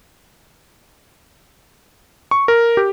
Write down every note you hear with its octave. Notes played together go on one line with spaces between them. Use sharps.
C#6
A#4
G4